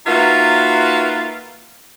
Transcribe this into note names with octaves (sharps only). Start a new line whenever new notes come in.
A#3 D#4 F4 F#4 B4 E5